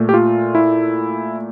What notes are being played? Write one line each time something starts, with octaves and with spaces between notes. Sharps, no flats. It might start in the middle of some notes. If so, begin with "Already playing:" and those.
Already playing: A#2 A3
G4
F4
E4